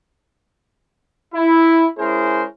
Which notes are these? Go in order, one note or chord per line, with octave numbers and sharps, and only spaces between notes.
E4
G#3 C#4 E4 G#4 A#4 C5